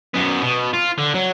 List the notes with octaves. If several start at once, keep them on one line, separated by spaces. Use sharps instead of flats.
F#2 B3
B2
F4
D3
F#3